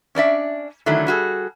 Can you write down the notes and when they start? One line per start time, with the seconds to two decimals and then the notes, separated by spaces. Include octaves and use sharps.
0.15 C#4 D4 D5 E5
0.86 D3 D#3 F#3 A3 E4
1.07 G3 F#4 G#4 A4